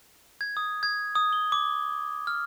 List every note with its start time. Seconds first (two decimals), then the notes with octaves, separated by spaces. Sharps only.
0.41 G#6
0.57 D#6
0.83 G#6
1.15 D#6
1.33 G7
1.52 D6
2.27 F6